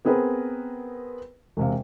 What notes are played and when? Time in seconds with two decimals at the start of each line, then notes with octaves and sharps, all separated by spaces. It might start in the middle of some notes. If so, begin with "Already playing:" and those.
0.05 B3 C4 G#4 A#4 B4
1.57 E1 C3 F5